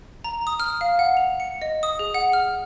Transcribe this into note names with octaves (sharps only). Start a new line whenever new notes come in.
A#5
D#6
F6
F5
F#5
F7
C#7
D#5
D#6
G#4
F#5
F6